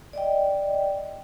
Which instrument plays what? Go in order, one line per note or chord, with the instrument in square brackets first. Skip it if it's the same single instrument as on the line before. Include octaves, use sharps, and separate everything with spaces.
[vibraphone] D5 D#5 G5